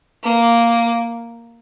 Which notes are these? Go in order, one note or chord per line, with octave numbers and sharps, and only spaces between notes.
A#3